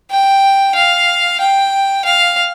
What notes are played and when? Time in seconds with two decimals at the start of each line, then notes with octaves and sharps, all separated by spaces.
0.11 G5
0.75 F5
1.40 G5
2.05 F5